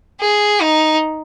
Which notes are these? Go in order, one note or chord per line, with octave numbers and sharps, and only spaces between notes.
G#4
D#4